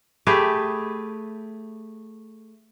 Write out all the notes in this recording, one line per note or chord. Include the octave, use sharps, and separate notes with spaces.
A3 G4 G#4 B4